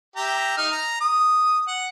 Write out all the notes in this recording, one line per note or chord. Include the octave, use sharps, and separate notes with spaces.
G4 E5 A#5
D#4 F6
A#5
D#6
F#5